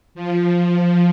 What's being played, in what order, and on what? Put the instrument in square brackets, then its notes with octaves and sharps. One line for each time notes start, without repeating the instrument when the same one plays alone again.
[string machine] F3